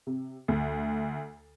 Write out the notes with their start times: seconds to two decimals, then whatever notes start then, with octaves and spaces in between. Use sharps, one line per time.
0.07 C3
0.48 D2